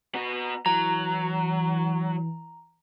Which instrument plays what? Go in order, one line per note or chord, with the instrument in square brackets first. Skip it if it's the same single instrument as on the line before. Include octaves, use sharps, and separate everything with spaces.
[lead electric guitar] B3 F#4 [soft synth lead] A#5
[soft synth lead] E3 [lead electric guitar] F#3 [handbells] A#5